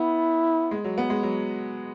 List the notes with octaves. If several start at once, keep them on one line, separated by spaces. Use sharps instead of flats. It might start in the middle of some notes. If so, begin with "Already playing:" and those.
Already playing: B3 E4
G#3
F#3
B3
G#3
F#3